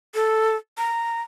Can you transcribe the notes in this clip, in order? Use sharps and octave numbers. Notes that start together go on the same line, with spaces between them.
A4
A#5